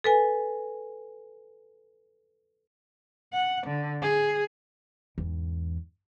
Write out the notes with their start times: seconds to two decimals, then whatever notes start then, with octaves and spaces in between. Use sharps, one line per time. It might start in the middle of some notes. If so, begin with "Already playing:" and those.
0.04 A4 B4 G#5
3.33 F#5
3.67 D3
4.02 G#4
5.18 E2 G#2